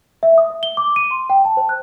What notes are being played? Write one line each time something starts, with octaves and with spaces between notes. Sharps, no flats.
E5
D#6
E5
G7
D6
D#7
C6
G5
A5
C5
F#6